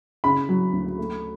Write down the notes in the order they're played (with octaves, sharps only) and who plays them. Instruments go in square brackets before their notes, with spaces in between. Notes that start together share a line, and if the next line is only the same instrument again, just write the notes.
[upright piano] C#3 B5
F#3
D2
A3